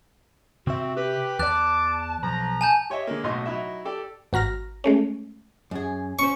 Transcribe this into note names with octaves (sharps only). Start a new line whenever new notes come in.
C3 C4 F#4 E5
G4 B4
E2 D5 A5 D6 F#6
B1 F3 A#5
G#5 A5 G6
G4 C#5 D#5 E5
D3 G#3 A#3
B1 A2 F#3 F#4 D#5 C6
F#3 D#4 E4 E5
G4 A4 D5
G#1 F#4 A#5 F6 A#6
G#3 A3 C#4
F#2 G#4
C#4 C5 C#6